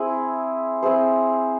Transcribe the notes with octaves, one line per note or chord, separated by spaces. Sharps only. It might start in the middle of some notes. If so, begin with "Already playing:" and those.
Already playing: C4 E4 G#4
C4 E4 G#4 C5